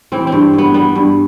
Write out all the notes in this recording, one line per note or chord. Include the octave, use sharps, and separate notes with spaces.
E3 C4
C4
G2
G2 B3
G3 B3
G2